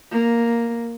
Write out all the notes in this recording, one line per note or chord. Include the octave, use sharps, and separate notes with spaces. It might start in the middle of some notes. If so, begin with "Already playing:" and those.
A#3